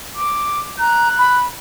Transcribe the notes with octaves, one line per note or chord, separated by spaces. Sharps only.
D6
A#5 F#6
B5